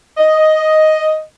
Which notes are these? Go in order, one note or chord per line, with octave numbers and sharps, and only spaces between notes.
D#5